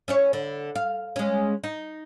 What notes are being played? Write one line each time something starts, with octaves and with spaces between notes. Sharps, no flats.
C#4 E4 C#5
D3
F5
G#3 C#4
D#4